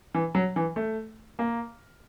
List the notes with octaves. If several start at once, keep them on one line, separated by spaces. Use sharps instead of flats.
E3
F#3
E3
A3
A#3